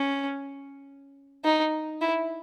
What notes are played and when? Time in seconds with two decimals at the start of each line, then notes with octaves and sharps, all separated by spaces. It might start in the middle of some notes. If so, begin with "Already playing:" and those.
Already playing: C#4
1.45 D#4
2.01 E4